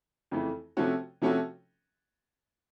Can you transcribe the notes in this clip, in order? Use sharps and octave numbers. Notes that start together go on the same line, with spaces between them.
F2 C#3 E3 A3
C3 F3 A3 C#4 F#4
C3 F3 A3 C#4 F#4